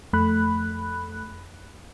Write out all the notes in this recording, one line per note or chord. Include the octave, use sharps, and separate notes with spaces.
F2 A3 B5 F#6